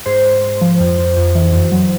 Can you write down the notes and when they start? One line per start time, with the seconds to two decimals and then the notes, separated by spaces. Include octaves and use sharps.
0.06 G#2 C5
0.25 G#2
0.43 G#2
0.61 F3
0.80 F2
0.98 F2
1.17 F2
1.35 E3
1.53 F#2
1.72 F#3